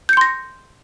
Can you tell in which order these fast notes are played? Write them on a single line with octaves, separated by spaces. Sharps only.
G6 C#7 C6 A#6